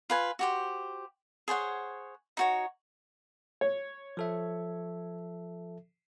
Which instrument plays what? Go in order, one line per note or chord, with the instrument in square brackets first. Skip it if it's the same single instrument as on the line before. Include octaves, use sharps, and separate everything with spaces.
[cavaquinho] F4 B4 G#5
F#4 G4 C5
G#4 C5 C#5 F#5
D#4 F#4 C#5
[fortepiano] C#5
[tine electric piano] F3 A4 E5